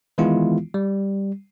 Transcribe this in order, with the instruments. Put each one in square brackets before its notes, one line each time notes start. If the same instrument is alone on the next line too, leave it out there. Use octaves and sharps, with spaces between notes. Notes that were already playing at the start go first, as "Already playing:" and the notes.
[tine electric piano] D#3 E3 G#3 B3 E4 F4
G3